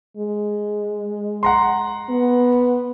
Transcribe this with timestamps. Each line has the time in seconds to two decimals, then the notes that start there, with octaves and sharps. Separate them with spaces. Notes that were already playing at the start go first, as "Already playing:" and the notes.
0.17 G#3
1.43 F#5 A#5 C6
2.10 B3